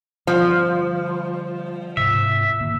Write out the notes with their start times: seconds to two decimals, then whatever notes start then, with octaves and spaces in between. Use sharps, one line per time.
0.27 D3 F3 G3
1.97 G#2 C3 E5
2.60 D3 D#3 A#3